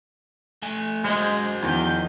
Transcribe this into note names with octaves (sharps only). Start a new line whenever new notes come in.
A3 G#5
F#3 G#3 C5 D#5
E2 D#3 F3 G6